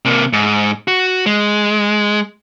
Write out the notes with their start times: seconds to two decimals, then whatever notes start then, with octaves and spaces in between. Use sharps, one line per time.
0.05 C3 A#3
0.33 G#2
0.88 F#4
1.26 G#3